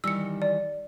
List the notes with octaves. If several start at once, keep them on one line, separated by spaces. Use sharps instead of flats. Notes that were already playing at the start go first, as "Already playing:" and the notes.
D#3 E3 G3 E6 C#7
D5